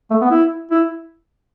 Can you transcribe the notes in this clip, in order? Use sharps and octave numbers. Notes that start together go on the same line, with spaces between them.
A3
B3
E4
E4